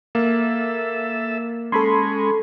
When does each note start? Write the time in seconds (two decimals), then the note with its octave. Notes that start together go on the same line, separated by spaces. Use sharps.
0.15 A#3 A4 E5
1.72 G#3 C#4 A4 B5 C6